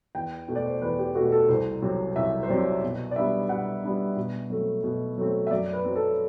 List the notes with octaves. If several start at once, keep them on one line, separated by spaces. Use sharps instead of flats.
E2 G5
B2 A3
D5
C5
E2 B4
G4
B2 A3 F#4
A4
C2 C5
C3 F#3 C4
C2 E5
C5
C3 F#3 C4 D5
B2
D5
G3 B3 D4 E5
B2 F#5
G3 B3 D4
B2
F#3 A3 C4
B2
F#3 A3 C4
E5
F#2 D5
B4
F#3 C4
A4